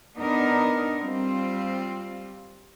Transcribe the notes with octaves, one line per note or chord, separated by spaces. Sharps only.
B3 D4 D#4 A#4
G3 C4 F4